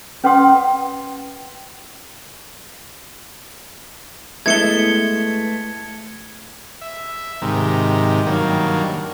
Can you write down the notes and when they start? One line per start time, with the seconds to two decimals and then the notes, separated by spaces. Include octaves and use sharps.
0.24 C#4 B4 F#5 G5 C6 D#6
4.46 G#3 A3 B3 E4 G#6 C#7 G7
6.81 E5
7.42 G#2 C3 D#3
8.27 G2 D#3 F#3 A#3